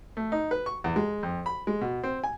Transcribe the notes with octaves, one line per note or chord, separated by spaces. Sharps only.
A3
D#4
B4
C#6
E2
G#3
F2
B5
G#3
B2
C4
G#5